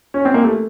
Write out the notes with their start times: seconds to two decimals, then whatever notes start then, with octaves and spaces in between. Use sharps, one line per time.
0.14 C#4
0.25 C4
0.34 A#3
0.44 A3